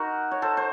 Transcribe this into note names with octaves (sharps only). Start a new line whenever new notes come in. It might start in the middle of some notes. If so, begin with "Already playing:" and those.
Already playing: D#4 F#4 A#4
C#5
A4 C5
C5